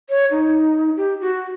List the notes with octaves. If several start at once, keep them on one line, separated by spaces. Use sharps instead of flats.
C#5
D#4
G4
F#4